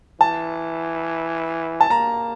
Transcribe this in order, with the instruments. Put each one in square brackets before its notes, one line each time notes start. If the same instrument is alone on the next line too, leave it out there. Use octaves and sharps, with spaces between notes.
[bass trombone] E3 [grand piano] A5
[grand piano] A5
[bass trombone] A#3 [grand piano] A#5